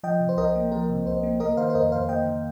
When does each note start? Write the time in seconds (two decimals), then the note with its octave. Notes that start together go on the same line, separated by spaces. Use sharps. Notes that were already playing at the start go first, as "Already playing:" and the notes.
0.03 F3 D#5 G5
0.20 C3
0.29 C5
0.37 C2 A#4 D#5
0.55 A#3
0.72 F3 A#4
0.90 C3
1.06 C2 C5
1.23 A#3
1.40 A#3 A#4 D#5
1.57 D#3 C5 F5
1.70 C5
1.75 F2 A#4 D#5
1.92 F2 C5 F5
2.09 A#3 D#5 G5
2.25 D#3